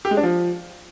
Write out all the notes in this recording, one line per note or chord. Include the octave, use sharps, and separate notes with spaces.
G4
G#3
D4
F3